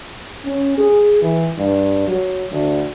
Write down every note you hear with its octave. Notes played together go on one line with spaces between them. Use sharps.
C#4
G#4
E3
G2
F#3
D2